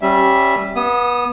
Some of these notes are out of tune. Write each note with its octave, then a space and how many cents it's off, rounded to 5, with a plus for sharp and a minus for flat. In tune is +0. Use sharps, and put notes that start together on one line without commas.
G3 -10 C#4 -25 E5 +0
B3 -25 D#6 +0